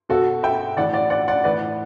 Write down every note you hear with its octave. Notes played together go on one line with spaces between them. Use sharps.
B2 F#4 A4
E5 G5
A2 E3 D5 F#5
D5 F#5
D5 F#5
D5 F#5
A2 E3 B4 D5